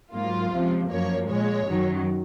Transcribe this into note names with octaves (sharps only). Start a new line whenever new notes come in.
G#2 F#3 A#3 F4
C#2 C3 F3
F#2 F3 A#3 C#5
A#2 G#3 C#5
F#2 D#3 F#3